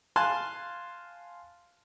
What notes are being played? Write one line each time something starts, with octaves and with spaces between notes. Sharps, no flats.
F5 G#5 A5 C6 F#6